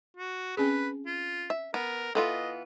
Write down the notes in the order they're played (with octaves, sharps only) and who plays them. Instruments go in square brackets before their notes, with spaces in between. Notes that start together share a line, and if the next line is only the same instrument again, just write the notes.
[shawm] F#4
[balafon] C4 C#4 G#4 [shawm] B4
[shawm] F4
[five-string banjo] E5
[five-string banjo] B3 [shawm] A#4
[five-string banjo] E3 B3 F4 [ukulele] A4 E5 [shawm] D#5